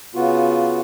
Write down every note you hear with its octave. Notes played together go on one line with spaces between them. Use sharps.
C#3 B3 F4 F#4